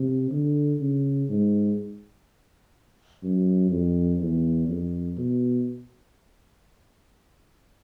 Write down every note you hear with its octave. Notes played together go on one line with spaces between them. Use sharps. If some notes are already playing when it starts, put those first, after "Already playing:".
Already playing: C3
D3
C#3
G#2
F#2
F2
E2
F2
B2